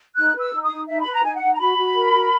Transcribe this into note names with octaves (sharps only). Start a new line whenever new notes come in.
D#4 F#6
B4
E6
D#4
D#6
D#4
D#4 E5
B5
B4
A#5
D#4 G#5
F#5
D#4
A#5
F#4 B5
F#4
A#4
F#4